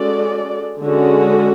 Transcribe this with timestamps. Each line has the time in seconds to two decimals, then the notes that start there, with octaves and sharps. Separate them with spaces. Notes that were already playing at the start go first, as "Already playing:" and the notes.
Already playing: G#3 C#4 F#4 A4 D5
0.81 D3 G#3 C#4 F#4